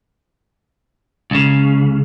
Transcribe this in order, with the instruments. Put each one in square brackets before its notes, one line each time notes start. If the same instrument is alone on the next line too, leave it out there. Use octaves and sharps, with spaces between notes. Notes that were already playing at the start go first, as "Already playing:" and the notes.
[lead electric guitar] C#2 C#3